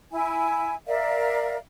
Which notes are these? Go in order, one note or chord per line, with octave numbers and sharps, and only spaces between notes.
E4 G#5
A#4 D5 E5 F5